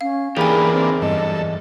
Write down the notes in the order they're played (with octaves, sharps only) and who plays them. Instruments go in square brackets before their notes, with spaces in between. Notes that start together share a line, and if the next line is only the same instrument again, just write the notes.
[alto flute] C#4 [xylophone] F5
[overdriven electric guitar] E2 G4 [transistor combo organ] E3 A#3 D4 [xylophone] G#4 G#5 [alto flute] B5
[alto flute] C4
[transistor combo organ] G2 A4 [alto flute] D#5